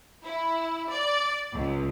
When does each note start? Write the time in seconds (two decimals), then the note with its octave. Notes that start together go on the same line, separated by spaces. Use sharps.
0.25 E4
0.91 D5
1.55 C#2